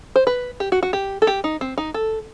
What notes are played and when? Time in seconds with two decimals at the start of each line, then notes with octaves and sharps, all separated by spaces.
0.16 C5
0.27 B4
0.60 G4
0.72 F#4
0.83 F#4
0.93 G4
1.22 A4
1.27 G4
1.44 D#4
1.61 C4
1.78 D#4
1.94 A4